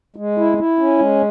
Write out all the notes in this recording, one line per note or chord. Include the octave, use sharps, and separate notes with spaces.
G#3
E4
E4
C#4
G#3